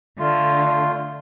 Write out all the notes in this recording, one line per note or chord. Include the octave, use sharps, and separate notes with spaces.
D3 A3 F4